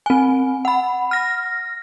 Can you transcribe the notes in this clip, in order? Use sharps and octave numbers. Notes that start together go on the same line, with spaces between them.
C4 G#5
F#5 B5
F6 A#6